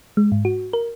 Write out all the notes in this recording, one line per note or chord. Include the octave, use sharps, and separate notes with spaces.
G#3
G#2
F#4
A#4